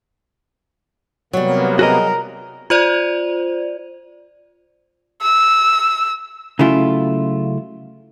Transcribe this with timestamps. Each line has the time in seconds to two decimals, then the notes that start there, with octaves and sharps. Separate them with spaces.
1.33 C3 F#3 G3 A#3 B3
1.79 F#4 G#4 A#4 D#5
2.70 F4 C5 D5
5.22 E6
6.59 C#3 F#3 A3 E4 F4